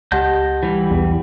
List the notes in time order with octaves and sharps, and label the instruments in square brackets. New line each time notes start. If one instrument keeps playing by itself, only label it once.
[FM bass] C#2 [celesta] G4 F#5 [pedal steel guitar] D#5 A5 G6
[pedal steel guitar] E3 G3
[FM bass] B1 [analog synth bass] E2